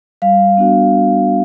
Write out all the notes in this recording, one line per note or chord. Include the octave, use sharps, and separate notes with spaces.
G3 F5
B3 D4 F#4